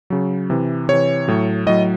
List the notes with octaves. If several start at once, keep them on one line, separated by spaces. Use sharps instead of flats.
C#3 F#3
C3 E3
C3 E3 C#5
A2 F#3
A2 F#3 D#5